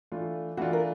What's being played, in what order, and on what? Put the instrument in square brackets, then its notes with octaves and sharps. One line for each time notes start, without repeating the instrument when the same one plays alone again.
[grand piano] E3 A3 D4 F4
[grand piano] E3 A3 D4 F4 [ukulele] F#4
[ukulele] A#4